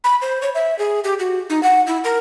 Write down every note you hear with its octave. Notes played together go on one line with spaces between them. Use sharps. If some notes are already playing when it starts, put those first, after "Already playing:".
B5
C5
C#5
E5
G#4
G4
F#4
D#4
F#5
E4
A#4